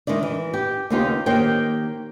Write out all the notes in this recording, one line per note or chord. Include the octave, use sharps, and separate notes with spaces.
D#3 G#3 E4 D5
E3
G4
D#2 C#3 B3 D#4 F4 G4
D#3 A#3 G4 C5 C#5 G5